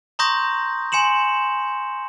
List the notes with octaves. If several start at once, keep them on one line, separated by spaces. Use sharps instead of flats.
A#5 C6 C#6 D#6 G6 A#6
G#5 C6 C#7 E7 F#7